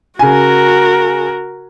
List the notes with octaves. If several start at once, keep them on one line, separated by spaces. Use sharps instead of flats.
C#3 F#4 A#4 G#5